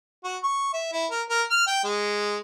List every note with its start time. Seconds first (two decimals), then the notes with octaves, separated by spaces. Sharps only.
0.24 F#4
0.43 C#6
0.73 E5
0.92 E4
1.11 A#4
1.29 A#4
1.51 F6
1.67 G5
1.84 G#3